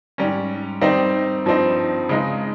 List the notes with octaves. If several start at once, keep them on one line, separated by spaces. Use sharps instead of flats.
G#2 G3 C#4
D#3 G3 C4 D#4
G2 F3 C4 D#4
C#3 G#3 D#4